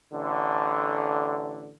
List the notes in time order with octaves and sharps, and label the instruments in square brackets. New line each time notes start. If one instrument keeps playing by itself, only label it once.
[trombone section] A1 D3